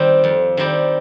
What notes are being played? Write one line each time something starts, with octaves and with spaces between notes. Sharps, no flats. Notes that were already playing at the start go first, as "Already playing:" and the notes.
Already playing: D#3 G3 C4 G4
F2
D#3 G3 C4 G4